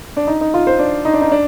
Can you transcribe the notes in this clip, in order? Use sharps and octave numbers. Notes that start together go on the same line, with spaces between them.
D4
D#4
D#4
F4
C5
D4
D#4
D4
D#4
D4